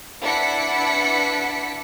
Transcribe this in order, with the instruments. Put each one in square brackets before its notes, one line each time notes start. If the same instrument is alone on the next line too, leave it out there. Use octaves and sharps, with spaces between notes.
[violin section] D4 E4 B4 F#5 B6 C#7